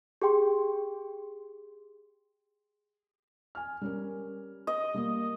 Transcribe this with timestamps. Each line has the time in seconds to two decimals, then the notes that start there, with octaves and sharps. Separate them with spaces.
0.22 G4 G#4 G5 C6
3.55 G#5 F6
3.81 G3 C#4 A#4
4.67 D#5
4.94 G3 A#3 A#4